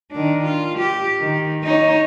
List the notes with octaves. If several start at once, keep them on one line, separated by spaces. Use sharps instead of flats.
D#3 D4
F4
G4
D#3
D#4 C#5